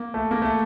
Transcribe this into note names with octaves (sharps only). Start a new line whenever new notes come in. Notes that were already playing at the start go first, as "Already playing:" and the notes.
Already playing: A#3
A3
A#3
A3